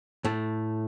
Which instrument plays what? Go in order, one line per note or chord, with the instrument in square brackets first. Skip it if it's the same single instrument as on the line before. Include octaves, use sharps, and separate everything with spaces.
[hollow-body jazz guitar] A2 A3